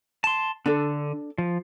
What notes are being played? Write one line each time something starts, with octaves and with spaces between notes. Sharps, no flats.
A5 C6
D3 D4 A4
F3